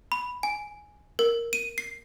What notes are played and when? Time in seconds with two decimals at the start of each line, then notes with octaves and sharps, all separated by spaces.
0.12 B5
0.43 G#5
1.19 A#4
1.53 D#7
1.78 C7